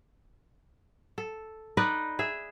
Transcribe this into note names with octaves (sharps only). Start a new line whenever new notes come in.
A4
D#4 B4 D5 D#5
G#4 E5